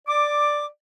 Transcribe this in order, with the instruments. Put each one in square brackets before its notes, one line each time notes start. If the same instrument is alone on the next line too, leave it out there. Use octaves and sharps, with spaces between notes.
[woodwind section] D5 D6